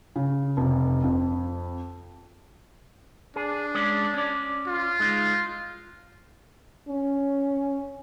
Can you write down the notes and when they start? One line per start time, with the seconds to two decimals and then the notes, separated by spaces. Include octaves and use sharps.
0.16 C#3
0.57 F1
1.04 F2
3.36 D4 G#4
3.75 G#3 C#4 D5
4.14 C#4 D5
4.67 F4
5.00 G#3 D#4
6.88 C#4